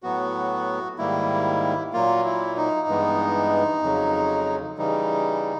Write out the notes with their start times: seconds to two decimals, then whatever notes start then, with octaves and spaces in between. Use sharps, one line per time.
0.03 A2 F#3 B3 F#4
0.98 G#2 D#3 G3 A#3 E4
1.93 A#2 F#3 A#3 F4
2.25 E4
2.57 D#4
2.88 G2 E3 G#3 B3
3.83 F2 C#3 F#3
4.77 C#3 E3 G3 D#4